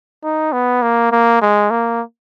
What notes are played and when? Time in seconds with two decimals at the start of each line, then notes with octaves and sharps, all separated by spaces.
0.23 D#4
0.53 B3
0.82 A#3
1.12 A#3
1.42 G#3
1.71 A#3